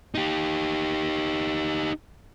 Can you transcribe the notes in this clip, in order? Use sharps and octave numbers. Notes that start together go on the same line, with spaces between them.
D#4 G4